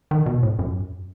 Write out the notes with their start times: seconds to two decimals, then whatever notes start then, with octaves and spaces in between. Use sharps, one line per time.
0.11 D#3
0.26 B2
0.43 A2
0.59 F#2